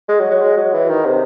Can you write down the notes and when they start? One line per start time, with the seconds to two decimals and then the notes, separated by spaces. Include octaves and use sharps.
0.08 G#3
0.20 F#3
0.30 F#3
0.41 G#3
0.57 F#3
0.74 E3
0.89 D#3
1.05 C3